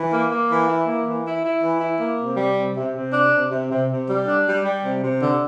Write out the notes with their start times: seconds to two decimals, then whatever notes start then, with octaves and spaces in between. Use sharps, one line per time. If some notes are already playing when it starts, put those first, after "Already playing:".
Already playing: E3
0.11 A#3
0.30 A#3
0.49 E3
0.68 E4
0.86 A#3
1.05 E3
1.24 E4
1.43 E4
1.61 E3
1.80 E4
2.00 A#3
2.19 C3
2.37 G3
2.57 C3
2.75 C3
2.95 C3
3.13 D4
3.32 C3
3.50 C3
3.70 C3
3.89 C3
4.08 G3
4.27 D4
4.46 G3
4.65 G3
4.83 C3
5.02 C3
5.21 D3